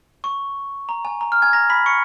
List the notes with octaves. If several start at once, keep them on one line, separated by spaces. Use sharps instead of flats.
C#6
A#5
G#5
A#5
F6
G#5 G#6
A#5 A#6
B5 B6
C#6 C#7